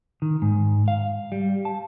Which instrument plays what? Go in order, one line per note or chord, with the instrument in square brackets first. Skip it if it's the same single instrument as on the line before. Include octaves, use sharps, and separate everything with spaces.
[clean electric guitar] D#3
G#2
F5
G3
A5